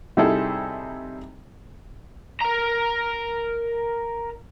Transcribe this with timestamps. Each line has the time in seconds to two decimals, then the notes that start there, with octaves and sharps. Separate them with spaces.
0.17 C3 G3 D#4 E4 G#4 A4
2.41 A#4 A#5